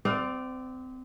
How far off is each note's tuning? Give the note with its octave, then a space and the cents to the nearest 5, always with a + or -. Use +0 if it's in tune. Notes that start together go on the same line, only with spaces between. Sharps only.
C4 -30 D5 +5 F5 +20